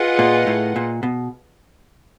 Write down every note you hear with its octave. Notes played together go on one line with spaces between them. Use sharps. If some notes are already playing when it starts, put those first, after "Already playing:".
Already playing: F4 G#4 B4 D#5 F#5
A#2
A2
A#2
B2